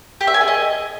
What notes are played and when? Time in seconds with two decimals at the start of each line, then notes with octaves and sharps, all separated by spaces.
0.21 G4
0.27 E5
0.34 G#5
0.41 G#4
0.48 D#5